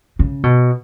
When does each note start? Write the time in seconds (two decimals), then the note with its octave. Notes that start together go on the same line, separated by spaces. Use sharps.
0.19 C#3
0.43 B2